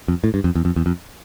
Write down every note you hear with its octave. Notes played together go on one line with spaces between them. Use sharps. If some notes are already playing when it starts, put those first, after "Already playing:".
F2
A2
G2
F2
E2
F2
E2
F2